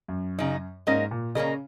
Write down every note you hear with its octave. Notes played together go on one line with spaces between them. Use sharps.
F#2
C#3 F#3 D#4
G#2 A#3 C#4 A#4 D#5
A#2
C#3 A#3 C#4 A#4 D#5